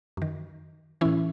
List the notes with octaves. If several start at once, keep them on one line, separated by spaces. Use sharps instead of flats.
F#2 D#3
A2 E3 C#4 E4